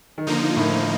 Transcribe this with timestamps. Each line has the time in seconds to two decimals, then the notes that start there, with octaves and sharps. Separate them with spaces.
0.18 D#3
0.27 D3 F3 A#3 D#4
0.56 A2